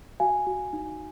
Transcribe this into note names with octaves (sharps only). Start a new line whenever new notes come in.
F#4 F5 G#5
F#4
D#4